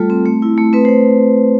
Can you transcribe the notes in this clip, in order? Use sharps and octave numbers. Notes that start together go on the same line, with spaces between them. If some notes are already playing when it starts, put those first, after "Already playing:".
Already playing: G3 A3 F4 A4
C4
A3
E4
A3
C4 B4
C5
A3